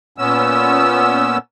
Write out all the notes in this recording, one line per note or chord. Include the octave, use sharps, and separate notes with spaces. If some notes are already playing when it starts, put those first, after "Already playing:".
A#2 B3 C#4 E6